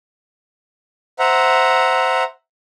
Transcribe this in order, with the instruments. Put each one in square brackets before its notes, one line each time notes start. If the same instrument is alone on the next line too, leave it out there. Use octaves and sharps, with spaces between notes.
[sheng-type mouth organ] C5 E5 F#5 A#5